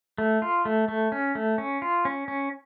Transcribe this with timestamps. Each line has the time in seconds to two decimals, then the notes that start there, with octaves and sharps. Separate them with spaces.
0.18 A3
0.42 F4
0.65 A3
0.88 A3
1.12 C#4
1.35 A3
1.58 C#4
1.82 F4
2.05 C#4
2.28 C#4